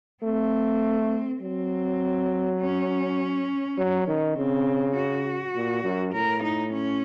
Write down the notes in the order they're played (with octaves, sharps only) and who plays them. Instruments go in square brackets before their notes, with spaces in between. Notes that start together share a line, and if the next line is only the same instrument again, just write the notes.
[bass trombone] A3 [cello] C4
[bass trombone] F#3 [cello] C4
[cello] C#4
[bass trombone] F#3
D#3
[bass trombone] C#3 [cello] C4
[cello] F#4
[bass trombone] A#2
F#2
[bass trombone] A2 [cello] A#4
[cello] D#4
C#4